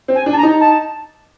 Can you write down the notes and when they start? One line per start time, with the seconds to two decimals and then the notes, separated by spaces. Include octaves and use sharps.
0.08 C4
0.15 G#5
0.26 D4
0.33 A5
0.37 A#5
0.43 D#4
0.60 A5